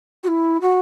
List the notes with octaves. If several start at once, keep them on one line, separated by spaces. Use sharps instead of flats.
F#4
E4
F#4